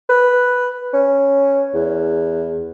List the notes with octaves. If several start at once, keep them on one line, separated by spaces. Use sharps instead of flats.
B4
C#4
E2